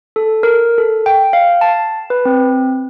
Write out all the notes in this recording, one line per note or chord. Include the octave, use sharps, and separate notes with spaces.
A4
A#4
A4
G5
F5
A5
B4
C4